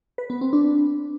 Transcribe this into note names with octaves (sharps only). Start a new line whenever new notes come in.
B4
B3
C4
D4